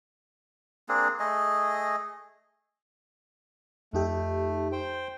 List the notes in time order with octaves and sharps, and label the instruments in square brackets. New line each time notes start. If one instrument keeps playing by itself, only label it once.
[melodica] A#3 C4 D4 G#4
A3 G#4 D#5
[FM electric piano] F2 D#4 G4 [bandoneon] A3
[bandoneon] C5 G5